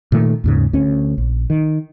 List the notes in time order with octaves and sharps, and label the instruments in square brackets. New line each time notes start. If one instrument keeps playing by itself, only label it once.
[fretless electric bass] A#2 D#3 A3
D#2 G#2 C#3
D2 C#4
A#1
D#3